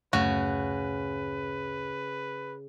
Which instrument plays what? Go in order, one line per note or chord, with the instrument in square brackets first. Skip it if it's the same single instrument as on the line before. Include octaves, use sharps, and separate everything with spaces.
[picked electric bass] D1 F#2 A3 [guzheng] C#3 [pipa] F#4 [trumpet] B4